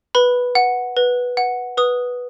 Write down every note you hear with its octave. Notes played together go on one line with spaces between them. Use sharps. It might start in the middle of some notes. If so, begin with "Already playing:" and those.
B4 B5
F#5
B4
F#5
B4 D#6